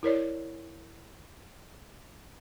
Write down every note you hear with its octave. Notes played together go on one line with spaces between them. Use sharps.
E4 A#4 C#5 D5